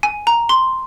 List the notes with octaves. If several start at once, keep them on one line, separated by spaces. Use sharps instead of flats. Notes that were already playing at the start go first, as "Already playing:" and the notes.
G#5
A#5
C6